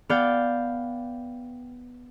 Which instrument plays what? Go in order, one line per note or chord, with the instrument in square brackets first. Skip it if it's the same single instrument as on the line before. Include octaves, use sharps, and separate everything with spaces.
[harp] B3 D5 F5 G5